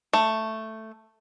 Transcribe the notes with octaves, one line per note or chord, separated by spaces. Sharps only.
A3